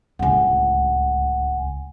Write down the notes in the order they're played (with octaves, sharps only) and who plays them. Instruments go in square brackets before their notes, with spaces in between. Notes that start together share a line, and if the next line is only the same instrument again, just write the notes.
[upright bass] D1 C#2 [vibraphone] F#5 G#5